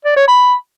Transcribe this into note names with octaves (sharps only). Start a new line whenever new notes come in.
D5
C#5
B5